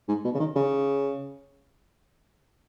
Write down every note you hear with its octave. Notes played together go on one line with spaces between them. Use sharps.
G#2
B2
C#3
D#3
C#3